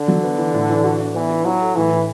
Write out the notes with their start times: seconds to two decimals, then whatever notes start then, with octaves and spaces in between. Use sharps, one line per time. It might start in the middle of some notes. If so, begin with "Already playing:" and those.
Already playing: D3
0.08 F#3
0.23 B3
0.38 E3
0.54 A2
0.70 E3
0.84 F#4
1.00 D4
1.14 E3 B3
1.30 E4
1.45 F#3 E4
1.61 A4
1.76 A2 E3
1.91 A2